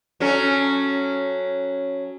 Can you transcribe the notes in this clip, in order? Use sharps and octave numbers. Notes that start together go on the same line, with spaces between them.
F#3 C#4 A4